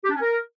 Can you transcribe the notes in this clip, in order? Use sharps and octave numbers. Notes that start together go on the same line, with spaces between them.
G4
D4
C#4
A#4